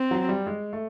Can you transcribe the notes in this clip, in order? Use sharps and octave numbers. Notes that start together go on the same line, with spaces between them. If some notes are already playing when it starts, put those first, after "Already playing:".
Already playing: C4
F#3
G3
G#3
A3